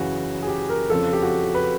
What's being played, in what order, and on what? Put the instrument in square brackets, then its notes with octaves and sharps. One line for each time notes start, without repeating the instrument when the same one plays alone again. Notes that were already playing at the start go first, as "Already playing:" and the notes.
Already playing: [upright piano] F#2 C#3 E3 F#4
G#4
G4
A#4
F2 C#3 F3 A4
G4
F#4
B4